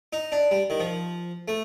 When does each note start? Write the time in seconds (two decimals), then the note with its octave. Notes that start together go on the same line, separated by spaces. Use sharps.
0.13 D#4
0.32 D4
0.51 G3
0.70 D#3
0.80 F3
1.48 A3